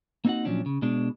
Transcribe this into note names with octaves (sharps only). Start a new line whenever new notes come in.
A#3 C4 D#4 F4 F#4 F#5
A#2 F3 F#3 C#4 D4
C#3
B2 G#3 D4